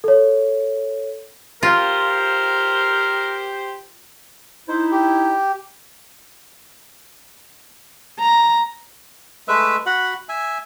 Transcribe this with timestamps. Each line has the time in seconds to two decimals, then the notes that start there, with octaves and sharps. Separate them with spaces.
0.04 A4 C#5
1.63 F4 G4 A#4 C5
4.68 D#4 E4 C5
4.92 G4
8.19 A#5
9.48 G#3 A3 B4 E5
9.86 F#4 F#5 B5
10.29 E5 G#5